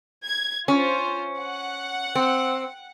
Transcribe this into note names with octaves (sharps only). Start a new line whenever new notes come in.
G#6
C#4 F4 C5
F#5
C4